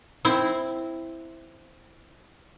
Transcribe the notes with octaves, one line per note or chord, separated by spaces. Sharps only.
C4 E4